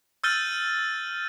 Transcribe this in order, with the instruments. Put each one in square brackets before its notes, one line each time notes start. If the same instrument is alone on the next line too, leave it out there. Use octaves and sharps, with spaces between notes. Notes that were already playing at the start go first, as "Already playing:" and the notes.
[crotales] E6 F6 G6 A6 D#7 G7